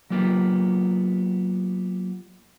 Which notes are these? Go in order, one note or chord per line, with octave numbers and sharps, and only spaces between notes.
F#3 A#3 B3 F4 G4